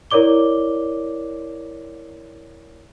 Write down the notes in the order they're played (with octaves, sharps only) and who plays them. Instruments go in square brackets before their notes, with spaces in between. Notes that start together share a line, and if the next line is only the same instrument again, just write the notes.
[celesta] E4 A#4 C#5 D5 D6 G7